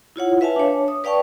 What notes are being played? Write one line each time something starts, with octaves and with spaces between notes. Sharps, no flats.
E4 F4 C#5 F#5
B4 E5 F5 G#5 A5
D4 C#5
D#6
B4 D5 F5 G5 A5 C#6